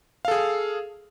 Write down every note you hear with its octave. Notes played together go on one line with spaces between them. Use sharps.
G#4 A4 F5